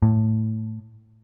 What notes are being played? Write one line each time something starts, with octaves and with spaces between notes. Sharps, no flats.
A2